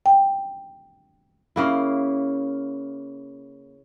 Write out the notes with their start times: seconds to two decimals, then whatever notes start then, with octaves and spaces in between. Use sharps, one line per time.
0.06 G5
1.56 C#3 A#3 E4